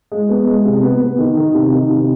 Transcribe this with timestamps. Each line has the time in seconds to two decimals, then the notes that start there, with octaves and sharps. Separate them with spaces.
0.12 G#3
0.30 B3
0.47 G#3
0.65 C3
0.83 B3
1.01 B3
1.19 D#3
1.37 D#3
1.54 C3
1.72 D#3
1.90 C3